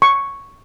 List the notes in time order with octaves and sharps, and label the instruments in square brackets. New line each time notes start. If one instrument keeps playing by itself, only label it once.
[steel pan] C#6